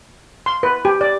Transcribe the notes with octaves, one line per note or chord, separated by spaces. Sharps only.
C6
B4
G4
D5